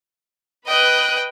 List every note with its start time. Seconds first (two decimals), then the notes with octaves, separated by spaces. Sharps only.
0.66 B4 D#5 G5 D#6 F#6